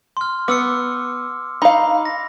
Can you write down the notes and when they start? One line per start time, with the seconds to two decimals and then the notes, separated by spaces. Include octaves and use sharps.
0.17 C6 F6
0.48 B3 D6 E6 C#7
1.62 D#4 F5 B5
2.05 A#6